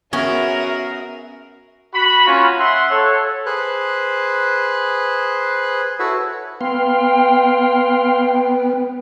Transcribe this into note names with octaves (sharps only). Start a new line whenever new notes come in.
B3 C#4 F#4 G#4 A#4 E5
F#4 B5
A#3 C#4 F4 F#4
E5 F#5 C6
A4 C#5
G#4 B4 C5 F#6
E4 F#4 A4 B4 C#5 E5
B3 F5 G5 C6